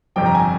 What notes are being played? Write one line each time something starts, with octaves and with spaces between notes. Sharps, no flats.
G1 F2 C3 F3 G5
A#5
G#5